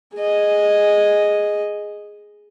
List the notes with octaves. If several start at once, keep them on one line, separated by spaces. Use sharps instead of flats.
G#4 D#5